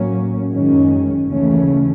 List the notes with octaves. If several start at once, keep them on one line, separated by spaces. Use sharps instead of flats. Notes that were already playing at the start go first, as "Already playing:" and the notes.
Already playing: A2 F#3 A#3 C#4
F#2 D#3 G#3 C#4
D#2 C#3 E3 A3 C#4